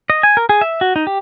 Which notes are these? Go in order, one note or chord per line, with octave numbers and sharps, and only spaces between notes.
D#5
G#5
A#4
G#4
E5
F#4
D#4
G4